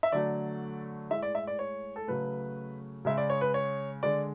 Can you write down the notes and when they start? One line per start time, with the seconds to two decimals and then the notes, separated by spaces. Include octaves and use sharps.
0.03 E5
0.12 D3 F#3 A3 D5
1.10 A2 G#3 E5
1.22 D5
1.35 E5
1.47 D5
1.59 C#5
1.96 A4
2.07 C#3 F#3 A3 B4
3.05 C#3 G#3 E5
3.18 D5
3.30 C#5
3.41 B4
3.54 C#5
4.03 D3 G#3 D5